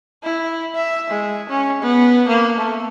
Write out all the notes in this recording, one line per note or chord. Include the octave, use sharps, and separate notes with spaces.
E4
E5
G#3
C#4
B3
A#3
A3